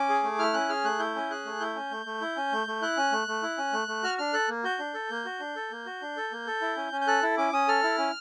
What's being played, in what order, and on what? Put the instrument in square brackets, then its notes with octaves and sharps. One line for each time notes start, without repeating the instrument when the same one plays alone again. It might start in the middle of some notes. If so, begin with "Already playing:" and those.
Already playing: [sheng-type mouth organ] C#4 D6
G#4
A3
E4 F6
C#4 F#6
G#4 F6
A3 F#6
E4 G6
C#4
G#4 F#6
A3
E4 G6
C#4
A3
A3
E4
C#4
A3
A3
E4 F#6
C#4
A3
A3
E4
C#4
A3
A3
F#4 F6
D4 F6
A4 F#6
A#3
F#4 G6
D4
A4
A#3
F#4
D4
A4
A#3
F#4
D4
A4
A#3
A4
E4
C#4
C#4
G6
A4 F#6
E4
C#4 D6
C#4 D#6
A4 F6
E4
C#4